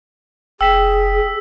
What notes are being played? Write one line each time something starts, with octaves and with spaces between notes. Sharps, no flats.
F1 G#4 G5 E6 B6 E7